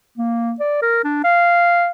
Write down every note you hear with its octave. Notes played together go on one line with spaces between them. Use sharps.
A#3
D5
A#4
D4
F5